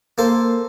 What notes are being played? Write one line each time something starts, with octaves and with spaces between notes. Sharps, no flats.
A#3 A4 C5